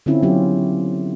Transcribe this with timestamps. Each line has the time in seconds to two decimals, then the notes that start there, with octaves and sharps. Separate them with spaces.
0.06 D3 C4 C#4 E4 F4
0.23 F#3 B3 C#4 F4 G4